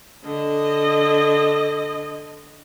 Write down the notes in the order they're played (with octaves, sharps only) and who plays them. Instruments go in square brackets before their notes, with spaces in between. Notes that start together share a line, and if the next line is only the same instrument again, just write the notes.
[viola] D3 D#5